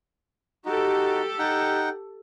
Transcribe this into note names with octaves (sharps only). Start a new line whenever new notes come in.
D#4 F#4 G4 A4
D#4 F#5 G5